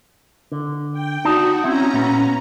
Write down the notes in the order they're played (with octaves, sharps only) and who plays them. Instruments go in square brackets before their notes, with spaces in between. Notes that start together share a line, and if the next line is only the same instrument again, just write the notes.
[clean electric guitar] D3
[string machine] G5
[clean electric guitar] D#4 D5 A5 [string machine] F#4
[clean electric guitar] C4 E4 [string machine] C#4 A#5
[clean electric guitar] A#2 B3